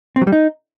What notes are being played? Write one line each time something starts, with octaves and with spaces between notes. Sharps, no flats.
C4
F#3
G3
D#4